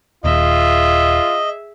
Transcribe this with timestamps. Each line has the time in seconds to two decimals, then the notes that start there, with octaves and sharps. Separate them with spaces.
0.24 D#1 F4 G#4 D#5 E5